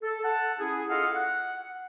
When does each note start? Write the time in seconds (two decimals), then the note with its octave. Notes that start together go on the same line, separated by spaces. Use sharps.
0.03 A4
0.24 A4 F#5 A5
0.59 C#4 E4 G#4
0.90 F4 A4 D#5 F5 F#5
1.15 F#5